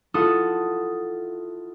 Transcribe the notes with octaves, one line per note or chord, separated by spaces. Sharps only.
E4 F4 A4 F#5 D#6